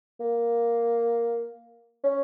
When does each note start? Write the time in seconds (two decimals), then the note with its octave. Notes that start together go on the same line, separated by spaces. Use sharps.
0.20 A#3
2.04 C#4